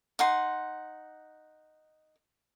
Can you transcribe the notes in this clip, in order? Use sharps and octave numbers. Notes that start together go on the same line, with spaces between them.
D#4 F#5 C6